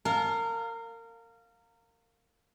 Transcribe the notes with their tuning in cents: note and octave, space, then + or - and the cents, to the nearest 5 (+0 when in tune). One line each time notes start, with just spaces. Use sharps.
A#4 -25 F5 +10 A5 -25